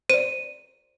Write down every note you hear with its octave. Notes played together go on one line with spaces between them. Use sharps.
C5 D5 D#7